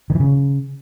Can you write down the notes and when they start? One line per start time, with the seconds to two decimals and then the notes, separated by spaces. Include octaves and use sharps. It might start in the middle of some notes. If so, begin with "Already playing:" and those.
0.10 D#3
0.15 E3
0.20 C#3